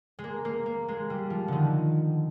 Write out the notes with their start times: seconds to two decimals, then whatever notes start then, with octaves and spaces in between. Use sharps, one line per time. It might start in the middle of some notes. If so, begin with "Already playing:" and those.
0.19 G#3
0.24 A#3
0.45 A#3
0.66 A#3
0.88 G#3
1.10 G3
1.30 F3
1.48 D3 D#3